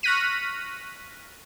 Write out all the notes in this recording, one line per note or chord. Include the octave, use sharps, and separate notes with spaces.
C#6 F6 F#6 A#6 B6 D#7